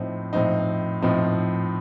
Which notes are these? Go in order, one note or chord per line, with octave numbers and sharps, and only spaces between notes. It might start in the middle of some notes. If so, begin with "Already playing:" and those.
Already playing: A2 F3 C4 D#4
A2 F3 C4 D#4
A2 F3 C4 D#4